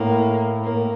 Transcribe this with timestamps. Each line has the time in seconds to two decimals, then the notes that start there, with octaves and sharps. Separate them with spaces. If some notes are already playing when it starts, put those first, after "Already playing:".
Already playing: A2 A#3
0.58 G2
0.62 A2 A#3